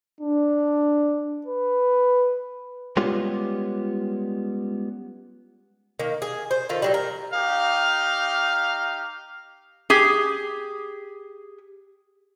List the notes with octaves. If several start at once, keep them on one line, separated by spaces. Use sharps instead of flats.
D4
B4
G3 G#3 B3 C#4 F4 G4
D#3 A#3
G#4
C5
D#3 F4 A4
D3 F#3 G3
A#4
D#4 G4 F5
G4 G#4